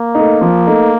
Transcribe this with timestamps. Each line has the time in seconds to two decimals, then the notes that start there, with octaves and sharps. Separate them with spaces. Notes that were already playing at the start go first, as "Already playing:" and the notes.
Already playing: A#3
0.15 A3 D#4
0.41 F3
0.67 A3 D#4